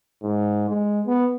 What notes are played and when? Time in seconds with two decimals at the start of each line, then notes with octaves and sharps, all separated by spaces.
0.23 G#2
0.69 G#3
1.07 B3